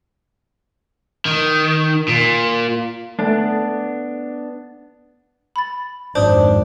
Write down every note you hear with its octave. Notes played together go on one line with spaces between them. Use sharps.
D#3
A#2
A3 B3 D4
B5 A6
G#1 F2 D4 C5 D#6